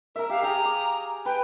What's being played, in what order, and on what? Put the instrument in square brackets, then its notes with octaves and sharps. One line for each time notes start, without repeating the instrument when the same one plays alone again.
[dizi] A#4 [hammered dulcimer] E5 A#5
[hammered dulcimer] G4 [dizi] F5
[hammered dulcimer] G#4 F5 G5 [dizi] A#5
[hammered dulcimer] D6
[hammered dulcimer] B4 [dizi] G5